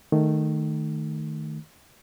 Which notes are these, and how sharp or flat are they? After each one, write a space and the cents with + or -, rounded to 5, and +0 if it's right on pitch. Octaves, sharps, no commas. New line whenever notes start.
D#3 -10 A3 +0